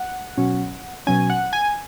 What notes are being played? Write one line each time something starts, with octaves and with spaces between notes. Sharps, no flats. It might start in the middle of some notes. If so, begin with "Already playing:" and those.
Already playing: F#5
B2 F#3 C#4
B2 F#3 C#4 G#5
F#5
G#5